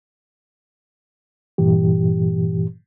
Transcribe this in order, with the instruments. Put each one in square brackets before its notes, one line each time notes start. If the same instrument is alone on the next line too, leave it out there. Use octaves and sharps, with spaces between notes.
[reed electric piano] G2 A#2 E3 G4